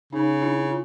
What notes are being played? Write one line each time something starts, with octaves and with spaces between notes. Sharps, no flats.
C#3 C#4 D#4
D4 E4
F4